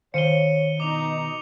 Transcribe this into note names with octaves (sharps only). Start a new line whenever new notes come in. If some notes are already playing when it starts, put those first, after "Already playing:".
D#3 C5 C#5 F5 C#7 D#7 G7
B2 D#4 D6 F7